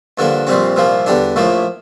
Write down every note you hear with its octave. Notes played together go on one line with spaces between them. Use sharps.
G2 D3 F3 A#3
A#1 A#2 G3 C4
C2 A#2 F3 A#3
E2 D3 G3 D4
A#1 A2 F3 A#3